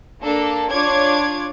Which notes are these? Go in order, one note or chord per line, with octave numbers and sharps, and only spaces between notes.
A#3 D4 A4
D4 F4 C#5 D6 G#6